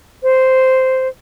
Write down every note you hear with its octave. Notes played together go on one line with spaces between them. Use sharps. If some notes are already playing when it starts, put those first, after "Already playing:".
C5